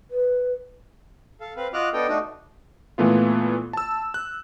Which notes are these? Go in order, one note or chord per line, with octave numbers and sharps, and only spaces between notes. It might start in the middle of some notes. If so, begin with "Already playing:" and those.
B4
A4 F5
C4 B4 F5
F4 F#4 D#5 D6 F6 F#6
B3 D4 A4 D#5 G5
A3 D4 D#4 F#4 D#5
A#2 E3 A3 B3 F4
A5 E6
F#6